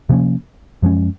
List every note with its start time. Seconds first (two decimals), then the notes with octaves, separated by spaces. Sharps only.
0.09 C3 F3 A#3 C#4
0.82 F#2 F3 G#3 C#4